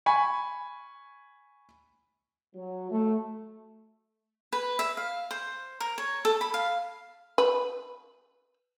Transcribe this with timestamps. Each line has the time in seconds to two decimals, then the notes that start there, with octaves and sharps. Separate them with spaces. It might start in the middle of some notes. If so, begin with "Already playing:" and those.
0.06 G#5 B5 C#6
2.55 F#3
2.91 A3
4.53 B4
4.79 E5
4.97 F5
5.31 C5
5.80 A#4
5.98 C#5
6.25 A4
6.41 B5
6.54 F5
7.38 B4